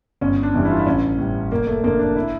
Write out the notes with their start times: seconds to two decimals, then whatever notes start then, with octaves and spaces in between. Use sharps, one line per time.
0.21 G1 C#4
0.43 D4
0.54 F2 E3 G3
0.65 E4
0.71 F4
0.79 E4
0.86 A1 C#4
1.18 A2 E3 G3
1.52 F1 A#3
1.67 A3
1.83 F2 D3 A#3
1.99 D4
2.16 E4